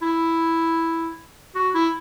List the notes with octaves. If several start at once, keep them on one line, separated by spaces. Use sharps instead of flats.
E4
F#4
E4